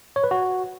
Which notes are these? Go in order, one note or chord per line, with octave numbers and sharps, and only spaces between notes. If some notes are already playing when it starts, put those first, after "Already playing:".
C#5
B4
F#4